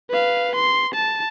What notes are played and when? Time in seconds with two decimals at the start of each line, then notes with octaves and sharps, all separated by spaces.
0.10 B4 F5
0.56 C6
0.95 A5